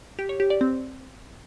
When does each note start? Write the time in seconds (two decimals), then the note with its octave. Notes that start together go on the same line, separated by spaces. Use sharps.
0.19 G4
0.29 C#5
0.40 G4
0.50 D5
0.61 C4